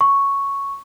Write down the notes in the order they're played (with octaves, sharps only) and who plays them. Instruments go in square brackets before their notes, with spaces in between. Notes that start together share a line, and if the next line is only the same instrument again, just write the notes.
[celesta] C#6